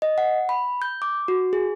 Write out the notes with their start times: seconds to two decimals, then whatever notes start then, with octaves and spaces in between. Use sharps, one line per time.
0.02 D#5
0.18 F#5
0.49 B5
0.82 G6
1.02 D6
1.28 F#4
1.53 G#4